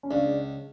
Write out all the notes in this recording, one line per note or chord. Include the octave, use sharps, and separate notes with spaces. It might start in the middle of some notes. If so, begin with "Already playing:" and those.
C#4
C#2 D4